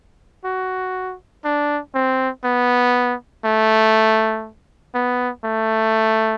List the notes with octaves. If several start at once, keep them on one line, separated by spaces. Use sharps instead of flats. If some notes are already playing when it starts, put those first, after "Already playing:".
F#4
D4
C4
B3
A3
B3
A3